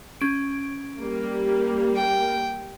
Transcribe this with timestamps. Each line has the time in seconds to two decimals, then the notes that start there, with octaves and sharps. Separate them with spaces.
0.21 C#4 D7
0.99 G3 A#3
1.95 G5